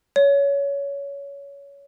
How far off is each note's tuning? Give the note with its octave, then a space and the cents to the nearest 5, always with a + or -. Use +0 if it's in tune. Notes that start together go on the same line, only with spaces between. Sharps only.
C#5 +20